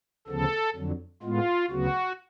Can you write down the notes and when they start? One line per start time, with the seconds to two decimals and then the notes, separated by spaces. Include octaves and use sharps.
0.27 D2 C#3 F3 B3 A4
0.75 F2 D3 F#3
1.23 A2 G#3 B3 F4
1.70 D2 C#3 F#3 B3 F#4